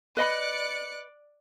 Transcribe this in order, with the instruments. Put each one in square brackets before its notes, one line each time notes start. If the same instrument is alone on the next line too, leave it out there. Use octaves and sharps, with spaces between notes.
[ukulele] B4 D#5 B5 [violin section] D5 F#6 C#7